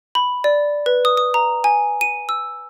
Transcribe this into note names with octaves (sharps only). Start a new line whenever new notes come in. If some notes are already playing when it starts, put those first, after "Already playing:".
B5
D5
B4
D#6
D#6
A#5
G#5
D#7
E6